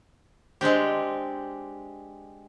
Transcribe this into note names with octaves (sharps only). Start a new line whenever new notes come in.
G#3 C4 D4 G4